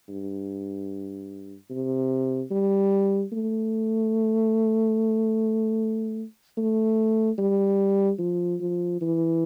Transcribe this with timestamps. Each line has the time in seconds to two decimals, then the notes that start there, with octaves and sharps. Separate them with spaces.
0.09 G2
1.70 C3
2.51 G3
3.33 A3
6.58 A3
7.39 G3
8.19 F3
8.61 F3
9.01 E3